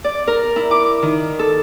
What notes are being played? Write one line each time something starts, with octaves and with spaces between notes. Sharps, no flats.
D5
A#4
E4
D6
D#3
A4